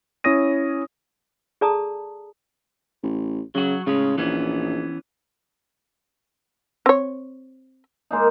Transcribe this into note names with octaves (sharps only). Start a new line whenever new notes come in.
C#4 E4 C#5 D#6 A#6 D#7
G#4 A4 D5 A5 A#5 D#6
A1
C#3 F#3 F#4
A2 C#3 G#3 C#4
A#1 E3 B3 C#4
C4 C#5
G#3 A#3 D#4